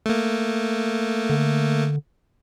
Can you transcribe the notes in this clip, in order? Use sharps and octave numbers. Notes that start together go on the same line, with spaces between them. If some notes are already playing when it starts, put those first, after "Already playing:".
A3 A#3
D3